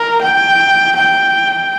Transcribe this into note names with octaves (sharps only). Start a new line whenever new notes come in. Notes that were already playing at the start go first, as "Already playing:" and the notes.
Already playing: A#4
G5
G5